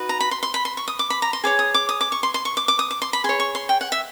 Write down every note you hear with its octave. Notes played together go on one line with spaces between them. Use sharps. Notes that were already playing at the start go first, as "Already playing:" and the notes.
Already playing: D#4 F#4 B4 D#5
A#5
B5
C6
C6
B5
C6
C#6
D#6
D6
B5
A#5
C6
G#4 C#5 D6
D#6
D6
D#6
D6
C#6
C6
C6
C#6
D6
D6
D#6
D6
C6
B5
G#4 C#5 C6
C#6
C6
G5
F#5
E5